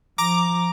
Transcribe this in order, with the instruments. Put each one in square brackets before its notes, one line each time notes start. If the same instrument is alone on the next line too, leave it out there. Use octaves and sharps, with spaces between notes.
[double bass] F3 [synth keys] A#5 D6